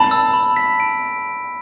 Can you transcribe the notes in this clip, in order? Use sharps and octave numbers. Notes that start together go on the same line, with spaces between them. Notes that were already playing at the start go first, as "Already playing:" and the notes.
Already playing: A5 B5
E6
B5
B6
D7